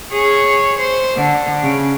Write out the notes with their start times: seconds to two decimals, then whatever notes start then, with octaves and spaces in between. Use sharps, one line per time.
0.12 G#4 C#5
0.79 C5
1.16 D3
1.62 C#3